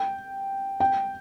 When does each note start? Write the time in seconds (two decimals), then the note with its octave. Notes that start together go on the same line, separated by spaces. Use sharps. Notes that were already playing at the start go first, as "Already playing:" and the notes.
Already playing: G5
0.80 G5